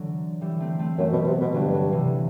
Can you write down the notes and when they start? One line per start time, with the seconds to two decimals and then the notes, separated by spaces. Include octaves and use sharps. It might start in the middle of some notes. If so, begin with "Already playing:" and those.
Already playing: D3 E3 F#3
0.41 E3 G3
0.60 A3 C4
0.79 A3 C4
0.98 F#2 F#3 A3
1.12 B2
1.26 C3
1.41 B2
1.54 G2 D3 F#3
1.73 D3 F#3
1.92 C3 E3